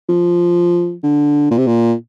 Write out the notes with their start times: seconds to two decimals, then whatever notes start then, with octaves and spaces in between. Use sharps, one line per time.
0.09 F3
1.03 D3
1.51 A#2
1.58 C3
1.67 A#2